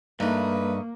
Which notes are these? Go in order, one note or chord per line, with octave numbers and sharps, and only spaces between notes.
G2 A3 A#3 D#4 B4